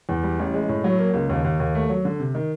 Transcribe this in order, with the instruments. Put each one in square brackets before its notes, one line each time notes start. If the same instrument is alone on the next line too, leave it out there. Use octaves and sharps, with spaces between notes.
[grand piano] E2
G3
A1
G#3
A2
F#3
A#3
C#2
D#2
D#2
D#2
A3
F#3
D3
C3
D#3